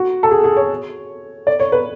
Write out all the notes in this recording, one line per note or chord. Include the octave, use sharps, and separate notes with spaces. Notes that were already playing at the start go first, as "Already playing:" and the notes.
Already playing: F#4
A4
G#4
G#4
C#5
D5
C#5
B4